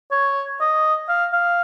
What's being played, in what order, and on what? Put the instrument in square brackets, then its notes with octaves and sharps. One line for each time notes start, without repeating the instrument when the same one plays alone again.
[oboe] C#5
D#5
F5
F5